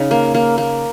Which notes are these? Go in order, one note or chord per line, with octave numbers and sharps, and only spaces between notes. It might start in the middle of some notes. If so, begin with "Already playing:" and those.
Already playing: C#3 D#4
A#3
A#3
A#3